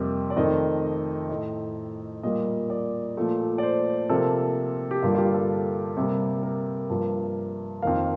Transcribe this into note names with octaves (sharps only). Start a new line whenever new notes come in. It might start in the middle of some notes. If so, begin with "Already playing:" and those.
Already playing: F2 C3 G3 A#3
D5
F2 D#3 A3 D#5
A2 A3 D#5
A#2 G3 A#3 D#5
D5
A#2 F3 A3
D5
C5
C3 F3 A#3 A4
G4
G2 D3 G3 A#3 F4
F4
G4
A4
C3 G3 A#3
A#4
G2 F3 A#3
F2 D#3 A#3 F5